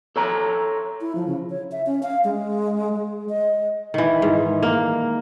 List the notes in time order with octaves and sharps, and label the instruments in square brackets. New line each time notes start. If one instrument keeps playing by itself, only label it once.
[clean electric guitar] A4 C#5 A#5
[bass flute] E4
F3
C#3
C#5
E5
C#4
F5
G#3
G#3
D#5
[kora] D#3 E3
G#2
A#3